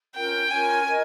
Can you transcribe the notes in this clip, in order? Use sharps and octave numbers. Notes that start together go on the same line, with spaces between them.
C#4 F4 A#4 G5
C#4 F4 A#4 G#5
A#4 D#5